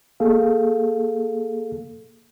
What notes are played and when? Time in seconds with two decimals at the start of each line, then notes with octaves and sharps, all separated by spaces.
0.20 A#3 G#4 A4 F5